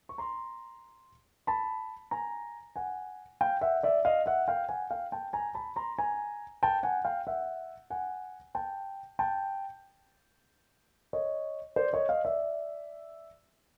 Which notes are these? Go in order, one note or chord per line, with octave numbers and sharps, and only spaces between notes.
C#6
A#5 C6
A5 B5
G#5 A#5
F#5 G#5
F5 G5
E5 F#5
D5 E5
D#5 F5
E5 F#5
F5 G5
F#5 G#5
F5 G5
G5 A5
G#5 A#5
A5 B5
A#5 C6
G#5 A#5
G5 A5
F#5 G#5
F5 G5
E5 F#5
F#5 G#5
G5 A5
G5 A5
C#5 D#5
C5 D5
C#5 D#5
D#5 F5
D5 E5